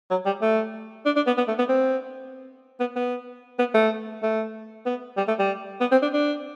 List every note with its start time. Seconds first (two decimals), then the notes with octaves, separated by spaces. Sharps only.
0.11 F#3
0.26 G3
0.42 A3
1.06 D4
1.16 D4
1.27 B3
1.38 B3
1.48 A3
1.59 B3
1.69 C4
2.80 B3
2.96 B3
3.59 B3
3.75 A3
4.23 A3
4.86 B3
5.17 G3
5.28 A3
5.39 G3
5.81 B3
5.92 C4
6.02 D4
6.13 D4